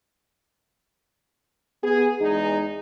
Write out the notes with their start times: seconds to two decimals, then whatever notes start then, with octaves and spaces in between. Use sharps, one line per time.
1.82 B3 G#4
2.20 E2 G#3 D#4